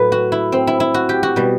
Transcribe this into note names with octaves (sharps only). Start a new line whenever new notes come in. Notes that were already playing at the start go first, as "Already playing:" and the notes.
Already playing: A2 F#3 A3 B4
F#4
E4
C4
E4
E4
F#4
G4
F#4
B2 G3